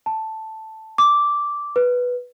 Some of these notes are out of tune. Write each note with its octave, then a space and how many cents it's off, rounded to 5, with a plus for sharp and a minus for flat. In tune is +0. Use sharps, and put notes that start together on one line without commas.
A5 +0
D6 -5
B4 -5